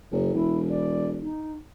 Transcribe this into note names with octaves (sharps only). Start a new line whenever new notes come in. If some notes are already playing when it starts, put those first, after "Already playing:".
F#1
E1 E4
D5
D#4